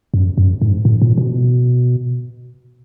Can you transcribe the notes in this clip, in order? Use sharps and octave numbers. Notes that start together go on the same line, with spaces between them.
F#2
F#2
G#2
A2
A#2
B2